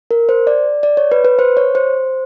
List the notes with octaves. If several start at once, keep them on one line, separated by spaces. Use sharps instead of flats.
A#4
C5
D5
D5
C#5
B4
B4
C5
C#5
C5